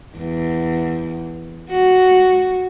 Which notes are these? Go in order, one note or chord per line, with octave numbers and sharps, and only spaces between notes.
E2
F#4